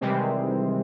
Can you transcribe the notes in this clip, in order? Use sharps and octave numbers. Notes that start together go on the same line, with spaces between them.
C3 D#3 E3 G3 G#3 C4